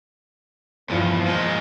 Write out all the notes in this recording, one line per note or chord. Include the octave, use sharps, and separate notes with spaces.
E2 G2 F3
A#2 G#3